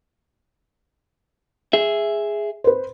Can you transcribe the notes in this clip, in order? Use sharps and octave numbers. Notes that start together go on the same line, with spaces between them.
G#4 E5
B4 C5